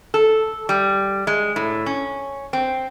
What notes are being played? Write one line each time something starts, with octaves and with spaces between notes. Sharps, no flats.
A4
G3
G#3
A2
C#4
C4